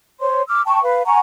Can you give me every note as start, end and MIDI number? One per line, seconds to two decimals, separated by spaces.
0.20 0.42 72
0.20 0.42 73
0.20 0.42 84
0.48 0.61 86
0.48 0.61 88
0.48 0.61 89
0.66 0.81 79
0.66 0.81 81
0.66 0.81 85
0.83 1.03 71
0.83 1.03 77
1.06 1.18 78
1.06 1.18 80
1.06 1.18 82
1.06 1.18 85